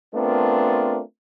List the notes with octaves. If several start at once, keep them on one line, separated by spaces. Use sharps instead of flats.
A3 B3 C4 D4 F4 A#4